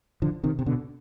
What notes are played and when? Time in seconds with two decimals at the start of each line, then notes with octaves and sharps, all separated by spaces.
0.22 D3 F3
0.44 C3 D#3
0.59 C3
0.66 B2 D3